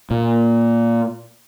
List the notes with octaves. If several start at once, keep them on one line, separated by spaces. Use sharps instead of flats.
A#2